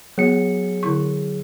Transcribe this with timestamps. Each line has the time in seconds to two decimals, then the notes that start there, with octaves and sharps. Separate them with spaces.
0.18 F#3 B3 G#4 C#7
0.83 D3 E4 C#6